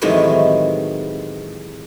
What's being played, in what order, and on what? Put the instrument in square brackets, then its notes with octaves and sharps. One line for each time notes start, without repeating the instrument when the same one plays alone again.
[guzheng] A2 C3 D#3 E3 F#3 G#3